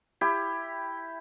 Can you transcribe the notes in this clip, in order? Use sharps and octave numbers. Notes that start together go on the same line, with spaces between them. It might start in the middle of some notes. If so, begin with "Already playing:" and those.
E4 G4